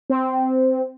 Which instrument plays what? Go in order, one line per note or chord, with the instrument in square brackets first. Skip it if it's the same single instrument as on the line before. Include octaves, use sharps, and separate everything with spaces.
[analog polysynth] C4